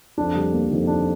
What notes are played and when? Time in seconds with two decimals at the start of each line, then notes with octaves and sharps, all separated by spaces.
0.18 F2 D4
0.35 G3
0.53 A#3
0.70 F2 D#3
0.87 D4